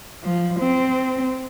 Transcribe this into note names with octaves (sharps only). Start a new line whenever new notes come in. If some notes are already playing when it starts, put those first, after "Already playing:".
F3
C4